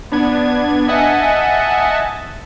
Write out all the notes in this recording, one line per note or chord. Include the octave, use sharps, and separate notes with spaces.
B3 D4 G#6
D#5 E5 F#5 G#5 A5